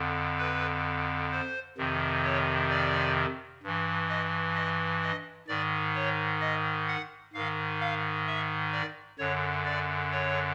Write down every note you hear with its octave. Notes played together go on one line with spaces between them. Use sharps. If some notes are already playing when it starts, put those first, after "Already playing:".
Already playing: F2 D3
B4
C5
F2 C3 D#3
C#5
D5
G2 E3
D#5
D#5
D#5
G#2 D#3 D5
C#5
D#5
F#5
G#2 D#3 F5
F5
E5
D5
F#2 D3 C#5
D5
C#5